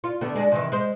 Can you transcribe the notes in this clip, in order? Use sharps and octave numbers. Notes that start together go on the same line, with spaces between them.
F4
D3 A3 B3
G#3 D4 G#4
C3 D#3 E3
G#3 C5